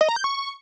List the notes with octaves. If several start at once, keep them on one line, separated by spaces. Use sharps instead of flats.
D#5
A#5
G6
C#6